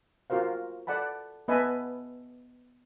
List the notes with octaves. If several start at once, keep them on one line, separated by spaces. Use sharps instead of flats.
F4 F#4 A#4 C5 F5
A4 D5 F#5 A5 B5
B3 B4 D#5 E5 G#5 A5